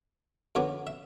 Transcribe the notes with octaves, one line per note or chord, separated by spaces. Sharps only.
F#2 D3 F#3 B3 D5
E5